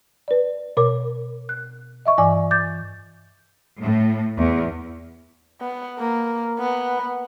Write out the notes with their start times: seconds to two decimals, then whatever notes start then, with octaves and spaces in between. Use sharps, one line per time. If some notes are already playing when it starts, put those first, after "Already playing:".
0.28 B4 D5
0.77 B2 A#4 C#5 D6
1.49 F#6
2.06 D#5 E5 C#6
2.18 G2 E3 D5 G#5 D6
2.51 D6 G6 A6
3.81 A2
4.37 E2
5.60 B3
5.98 A#3
6.58 B3